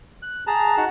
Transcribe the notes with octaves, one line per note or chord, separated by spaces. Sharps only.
F#6
G#4 A5 A#5
D#4 F#4 F#5